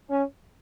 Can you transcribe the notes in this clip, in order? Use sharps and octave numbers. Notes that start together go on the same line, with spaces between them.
C#4